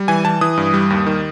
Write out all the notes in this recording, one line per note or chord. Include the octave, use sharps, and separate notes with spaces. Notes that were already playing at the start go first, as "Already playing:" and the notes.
Already playing: G3
E3 G#5
E3 A5
E3 D#6
G2
G3
D#2
D#3